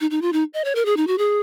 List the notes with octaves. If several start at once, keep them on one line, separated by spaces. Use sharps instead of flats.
D#4
D#4
F4
D#4
D#5
C#5
A#4
G#4
D#4
F#4
G#4